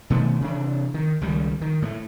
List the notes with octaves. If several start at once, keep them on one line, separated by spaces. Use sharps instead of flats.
B2 D#3 A3 B3
C3 E3 D4
D#3
C#2 D#3 G3
D#3
A2 G3 A3